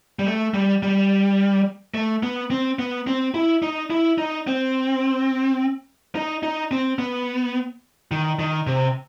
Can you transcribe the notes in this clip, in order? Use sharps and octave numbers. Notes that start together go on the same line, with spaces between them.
G3
A3
G3
G3
A3
B3
C4
B3
C4
E4
D#4
E4
D#4
C4
D#4
D#4
C4
B3
D#3
D#3
C3